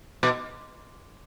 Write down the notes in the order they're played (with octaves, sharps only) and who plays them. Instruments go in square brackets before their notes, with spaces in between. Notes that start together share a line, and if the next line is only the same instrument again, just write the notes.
[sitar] B2